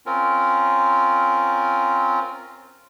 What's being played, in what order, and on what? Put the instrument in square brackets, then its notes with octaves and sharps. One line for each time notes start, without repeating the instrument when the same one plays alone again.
[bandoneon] C4 C#4 F4 A#4